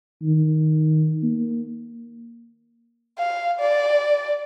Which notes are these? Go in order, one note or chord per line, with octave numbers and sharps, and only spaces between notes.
D#3
A#3
F5
D5